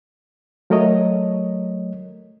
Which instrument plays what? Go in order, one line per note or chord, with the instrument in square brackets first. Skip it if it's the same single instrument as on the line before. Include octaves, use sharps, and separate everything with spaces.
[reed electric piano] F#3 A3 A#4 C#5 D#5